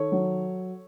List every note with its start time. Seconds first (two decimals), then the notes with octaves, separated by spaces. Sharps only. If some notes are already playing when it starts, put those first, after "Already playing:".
Already playing: D#3 A4 C#5
0.12 F#3